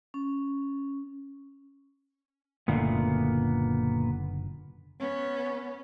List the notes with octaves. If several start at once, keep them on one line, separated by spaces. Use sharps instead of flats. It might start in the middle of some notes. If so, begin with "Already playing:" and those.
C#4
F#1 A#2 D3 A3 B3
B3 C#4